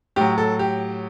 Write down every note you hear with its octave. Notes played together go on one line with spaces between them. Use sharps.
A2 F#3 G4
A4
G4